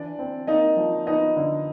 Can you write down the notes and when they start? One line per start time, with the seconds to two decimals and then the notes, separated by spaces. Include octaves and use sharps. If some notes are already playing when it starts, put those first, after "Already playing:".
Already playing: E3 D4 D5
0.19 C4
0.47 A#3 D#4 D#5
0.77 F3
1.06 B3 D#4 D#5
1.36 D3